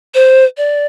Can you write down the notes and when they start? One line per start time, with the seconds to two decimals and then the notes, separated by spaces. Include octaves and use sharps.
0.15 C5
0.57 D5